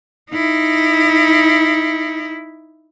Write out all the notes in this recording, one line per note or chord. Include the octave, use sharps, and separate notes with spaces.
D#4 E4